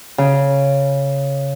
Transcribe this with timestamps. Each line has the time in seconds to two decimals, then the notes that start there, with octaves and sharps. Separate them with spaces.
0.18 C#3